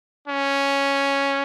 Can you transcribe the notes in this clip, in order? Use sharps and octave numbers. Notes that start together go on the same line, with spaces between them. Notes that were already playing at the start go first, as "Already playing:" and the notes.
C#4